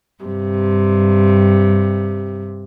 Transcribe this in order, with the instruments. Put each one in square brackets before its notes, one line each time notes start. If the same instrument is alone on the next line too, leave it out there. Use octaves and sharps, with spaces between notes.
[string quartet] G2 C3